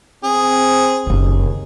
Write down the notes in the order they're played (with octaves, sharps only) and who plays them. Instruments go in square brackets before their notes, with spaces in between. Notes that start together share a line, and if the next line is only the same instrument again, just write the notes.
[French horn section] C4 [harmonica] G#4
[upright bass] F#1 C#3 [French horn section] D#2